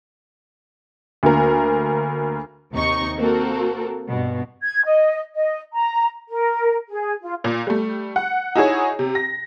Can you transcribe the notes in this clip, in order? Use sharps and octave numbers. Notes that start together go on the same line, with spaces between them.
D2 A#3 A#4
D#2 C3 D#4 C#6
A#3 C4 F#4 A4 A#4
G2 B2
G#6
D#5
D#5
A#5
A#4
G#4
F4
A#2
G3 A3
F#5
D#4 E4 F#4 G#4 C#5
C3
A#6